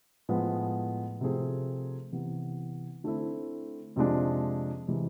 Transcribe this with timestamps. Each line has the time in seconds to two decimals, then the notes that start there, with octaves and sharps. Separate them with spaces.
0.29 A2 F3 G#3 B3
1.21 C3 F3 A3 C4 G#4
2.12 C3 E3 B3
3.04 D3 A3 C4 E4
3.96 F2 C3 F3 G#3 D4
4.88 C3 E3 G#3